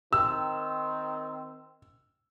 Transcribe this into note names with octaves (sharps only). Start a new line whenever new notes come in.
D#3 C4 E6